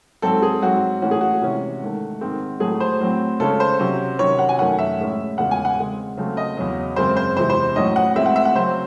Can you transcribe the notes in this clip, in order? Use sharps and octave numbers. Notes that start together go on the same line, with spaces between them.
G#2 F#3 C4 A4
G#4
G#2 F#3 C4 F#4
A2 E3 A3 C#4 F#4
G#4
F#4
C3 E3 G#3 C#4
G#2 D#3 A3
G#2 D#3 G#3 C4
A2 F#3 A3 G#4
C5
A2 F#3 C4
C#3 G#3 C#4 A4
C5
C3 F#3 C#4
C3 D#3 F#3 C#4 C#5
F#5
G#5
F#2 D#3 A3 C#4 F#5
E5
A2 G#3 C#4
E2 C#3 G#3 F#5
G#5
F#5
C#3 G#3 C4
C#3 F#3 A3 C4
D#5
E2 C#3 F#3
F#2 C#3 G#3 C4 C5
C5
E2 C3 E3 G#3 C5
C5
A2 F#3 C#4 D#5
F#5
A2 G#3 C4 E5
F#5
E5
F#5
C#3 F#3 C4 C5